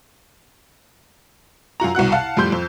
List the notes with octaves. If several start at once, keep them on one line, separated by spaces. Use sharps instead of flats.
F#2 F4 F#4 A#5
C2 B2 F#5 F#6
F5 F#5 A5
F2 A2 G3 C6 G6
F2